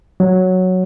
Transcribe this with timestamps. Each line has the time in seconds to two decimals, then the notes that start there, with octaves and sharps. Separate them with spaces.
0.20 F#3